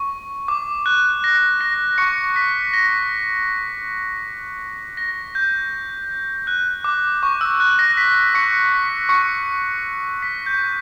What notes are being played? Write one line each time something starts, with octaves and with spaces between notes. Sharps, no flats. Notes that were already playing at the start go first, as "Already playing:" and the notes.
Already playing: C#6
D6
F#6
A#6
A#6
C#6 C#7
B6
A#6
A#6
G6
F#6
D6
C#6
E6
F#6
A#6
B6
C#6 C#7
B6
C#6 C#7
B6
G6